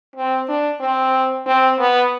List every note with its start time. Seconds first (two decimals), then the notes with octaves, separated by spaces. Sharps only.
0.16 C4
0.49 D4
0.81 C4
1.46 C4
1.79 B3